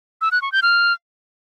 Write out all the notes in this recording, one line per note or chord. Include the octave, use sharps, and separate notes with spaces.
E6
F#6
C#6
G6
F6